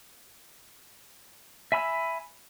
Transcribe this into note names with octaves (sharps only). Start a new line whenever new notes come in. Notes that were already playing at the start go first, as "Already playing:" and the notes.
E5 G#5 B5 E6